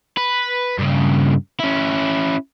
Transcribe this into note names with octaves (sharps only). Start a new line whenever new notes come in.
B4
G2 C#3
C#4 E4